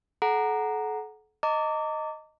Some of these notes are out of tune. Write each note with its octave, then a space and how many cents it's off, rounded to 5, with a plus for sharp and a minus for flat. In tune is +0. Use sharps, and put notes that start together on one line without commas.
A4 -40 F#5 +0 A#5 +0
D#5 +0 A#5 -40 D6 -20